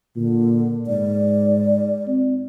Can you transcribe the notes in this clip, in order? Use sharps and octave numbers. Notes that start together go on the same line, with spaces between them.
A#2 D3
G#2 D5
C4